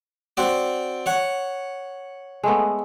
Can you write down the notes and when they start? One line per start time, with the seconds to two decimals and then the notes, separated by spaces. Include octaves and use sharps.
0.37 C4 F#4 D5
1.06 C#5 F#5
2.44 G#3 A3 B3